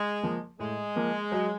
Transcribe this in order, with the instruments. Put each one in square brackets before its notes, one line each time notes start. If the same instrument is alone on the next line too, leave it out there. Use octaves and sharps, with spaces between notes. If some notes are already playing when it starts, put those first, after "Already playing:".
Already playing: [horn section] G#3
[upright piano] F3 A#3
[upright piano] A2 [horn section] G#3
[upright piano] F3 A#3
F#3